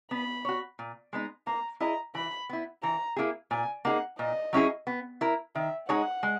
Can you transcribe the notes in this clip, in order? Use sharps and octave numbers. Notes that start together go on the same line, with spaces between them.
B3 B5
F#4 C#5
A#2
G#3 B3 D#4
A#3 A#5
E4 G#4 D#5 A#5
E3 B5
B3 E4
E3 A#5
A#3 E4 G#4
A#2 G#5
A#3 D#4 G#4 F#5
A#2 D#5
F#3 C#4 E4 G#4
B3
E4 A#4
D#3 E5
G#3 D#4 G#4 C#5 F#5
G#3